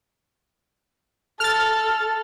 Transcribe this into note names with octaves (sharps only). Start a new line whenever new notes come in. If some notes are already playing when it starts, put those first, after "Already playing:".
A4 F6 A6